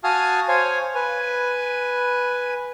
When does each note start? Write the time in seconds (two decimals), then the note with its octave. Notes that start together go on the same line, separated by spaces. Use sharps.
0.04 F#4 F5 G#5 A5 D#6 F6
0.48 C5 C#5 F5 G#5
0.95 B4 G#5